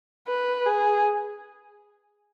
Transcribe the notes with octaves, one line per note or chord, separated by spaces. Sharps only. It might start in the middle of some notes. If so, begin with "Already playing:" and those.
B4
G#4